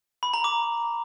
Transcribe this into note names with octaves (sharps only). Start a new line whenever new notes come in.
B5
A#5
D6